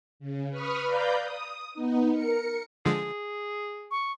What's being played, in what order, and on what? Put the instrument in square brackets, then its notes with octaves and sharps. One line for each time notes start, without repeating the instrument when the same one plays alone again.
[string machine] C#3
B4 B5 C#6 D#6 F6
B4 D5 F5 A#5 B5 G6
D#6
B3 D#4
A#4 C#7
[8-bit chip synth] D3 F3 G#3 [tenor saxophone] G#4
[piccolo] C#6